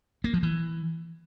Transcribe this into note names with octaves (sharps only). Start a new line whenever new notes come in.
A#3
F3
E3